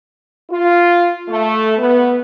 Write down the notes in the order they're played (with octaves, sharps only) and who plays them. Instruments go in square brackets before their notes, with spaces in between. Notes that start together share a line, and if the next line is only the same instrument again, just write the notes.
[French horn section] F4
A3
B3